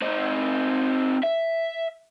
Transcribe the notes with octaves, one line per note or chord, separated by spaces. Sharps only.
C4 D#4
E5